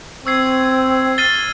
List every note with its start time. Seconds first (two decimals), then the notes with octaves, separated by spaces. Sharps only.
0.25 C4 C#6 E6 G#6 C7
1.18 F6 A6 C7 D#7 G7